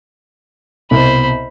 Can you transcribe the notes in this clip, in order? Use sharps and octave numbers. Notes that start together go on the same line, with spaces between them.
C2 B2 C5 B5